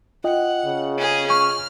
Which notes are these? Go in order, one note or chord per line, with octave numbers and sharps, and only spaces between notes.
F4 D#5 F#5 G5
C#3
C#4 G#4
C#6 F6